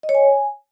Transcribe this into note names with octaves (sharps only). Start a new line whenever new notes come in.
D#5
C#5
G#5